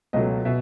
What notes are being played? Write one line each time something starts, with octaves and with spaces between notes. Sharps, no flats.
C#2 B2 F#3 A3 D#5
B2 E5